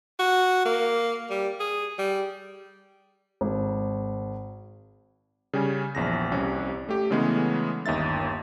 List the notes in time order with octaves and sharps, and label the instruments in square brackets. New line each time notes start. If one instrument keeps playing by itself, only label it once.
[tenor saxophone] F#4
A#3
G3
G#4
G3
[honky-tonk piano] G#1
[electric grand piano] C#3 G3 C#4 G#5
A#1 E2 A#6
C2 C3 C#4
A3 G4
C#3 E3 G#3 A3 B3 C#4
G1 D#2 D#4 E5 A6